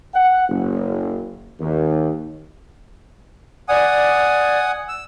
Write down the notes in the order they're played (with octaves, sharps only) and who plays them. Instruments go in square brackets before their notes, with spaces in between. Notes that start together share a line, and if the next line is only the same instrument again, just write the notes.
[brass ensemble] F#5
F#1
D#2
[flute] D5 [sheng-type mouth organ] F#5 G#5 D#6
[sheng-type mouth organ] E6